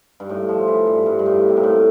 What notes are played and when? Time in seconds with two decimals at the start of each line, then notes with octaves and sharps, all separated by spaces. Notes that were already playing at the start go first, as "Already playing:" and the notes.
0.20 G2
0.29 A2
0.49 F3
0.68 E3
0.87 G2
1.06 G2
1.19 G2
1.26 A2
1.48 C3
1.57 A#2
1.64 A2